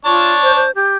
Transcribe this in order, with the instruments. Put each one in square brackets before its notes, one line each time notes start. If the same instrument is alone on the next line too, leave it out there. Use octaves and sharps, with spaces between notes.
[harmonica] D4 C#5 A5 [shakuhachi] F4
[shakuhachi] C5
C5
G4